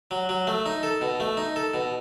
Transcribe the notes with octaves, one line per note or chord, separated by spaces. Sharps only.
F#3
F#3
A3
D#4
A4
B2
A3
D#4
A4
B2